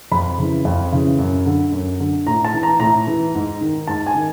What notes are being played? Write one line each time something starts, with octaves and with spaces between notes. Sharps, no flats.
F2 B5
C#3 E3
F2
C#3 E3
F#2
D3
F#2
D3
A2 A#5
A5
E3
A#5
A2 A#5
E3
G#2
D#3
G#2 A5
G#5
D#3